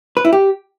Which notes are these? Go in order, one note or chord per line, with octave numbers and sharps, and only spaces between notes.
B4
E4
G4